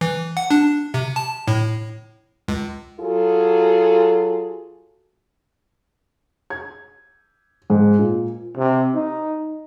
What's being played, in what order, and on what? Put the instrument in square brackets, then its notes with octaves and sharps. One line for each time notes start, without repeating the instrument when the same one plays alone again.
[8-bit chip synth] E3
F#5
D4
C3
A5
A2
C#2
[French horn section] F#3 F4 F#4 G#4 A4
[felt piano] G#6
G#2
A#2
[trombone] C3
D#4